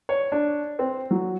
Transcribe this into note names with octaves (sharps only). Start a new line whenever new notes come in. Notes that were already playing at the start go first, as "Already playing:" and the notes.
C#5
D4
C4
F#3